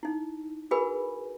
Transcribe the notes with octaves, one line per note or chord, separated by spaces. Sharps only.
D#4 E4
F#4 G#4 A#4 B4 G#5 B5